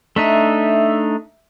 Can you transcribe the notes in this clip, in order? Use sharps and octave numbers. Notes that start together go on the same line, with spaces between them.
A3 D4 D#4 E5